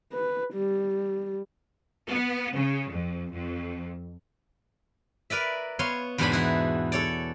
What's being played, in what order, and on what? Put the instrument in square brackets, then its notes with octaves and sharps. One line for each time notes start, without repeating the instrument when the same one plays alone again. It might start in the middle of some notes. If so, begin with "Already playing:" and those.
[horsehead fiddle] B4
G3
[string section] B3
C#3
F2
F2
[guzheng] A#4 B4 D5 E5
B3 C#5 F5 C6
E2 G#2 B2 D4 G#4 B5
E3 E4 F#4
A4 C#5 D5